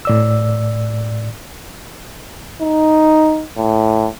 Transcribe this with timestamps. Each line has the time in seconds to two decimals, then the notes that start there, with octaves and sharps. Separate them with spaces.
0.05 A2 D5 E6
2.62 D#4
3.58 A2